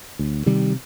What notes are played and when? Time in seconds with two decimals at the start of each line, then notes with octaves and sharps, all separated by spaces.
0.19 D2
0.46 C3 D#3 G3